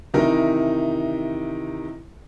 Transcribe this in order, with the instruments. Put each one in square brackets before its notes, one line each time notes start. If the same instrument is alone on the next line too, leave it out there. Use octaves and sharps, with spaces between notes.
[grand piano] C3 D#3 E3 D#4 E4 A#4